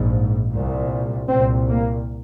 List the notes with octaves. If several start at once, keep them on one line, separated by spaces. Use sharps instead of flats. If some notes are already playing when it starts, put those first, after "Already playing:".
Already playing: A#1 G#2
C2 A#2
C2 A#2 C4
A#3